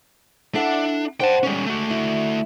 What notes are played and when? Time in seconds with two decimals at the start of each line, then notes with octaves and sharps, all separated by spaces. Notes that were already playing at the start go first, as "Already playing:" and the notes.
0.55 D4 E4 A4 F#5
1.20 D4 C5 F#5 G5 A5
1.43 D3 G3 G#3 C#4
1.66 A3 F#4
1.90 E4